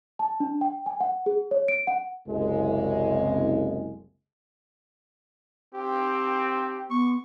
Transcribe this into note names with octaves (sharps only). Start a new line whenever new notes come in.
A5
D4
G5
G#5
F#5
G#4
C#5
D7
F#5
F#1 C2 G#3
C4 G4
B3 C#6